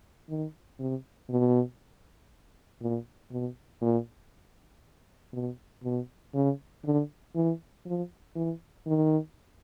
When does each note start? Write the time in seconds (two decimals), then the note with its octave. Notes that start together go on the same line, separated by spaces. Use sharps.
0.29 D#3
0.79 C3
1.30 B2
2.81 A#2
3.31 B2
3.82 A#2
5.33 B2
5.83 B2
6.34 C#3
6.85 D3
7.35 E3
7.86 F3
8.36 E3
8.87 D#3